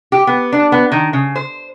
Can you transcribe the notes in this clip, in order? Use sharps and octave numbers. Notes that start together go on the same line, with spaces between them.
G4
B3
D4
B3
D#3
C#3
C5